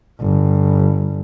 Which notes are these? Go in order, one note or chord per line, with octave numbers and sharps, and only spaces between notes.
G1